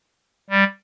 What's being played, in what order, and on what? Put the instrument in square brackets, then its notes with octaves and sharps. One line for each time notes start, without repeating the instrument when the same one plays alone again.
[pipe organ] G3